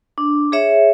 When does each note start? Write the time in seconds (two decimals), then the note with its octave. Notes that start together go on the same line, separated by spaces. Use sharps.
0.18 D4
0.52 G#4 C#5 E5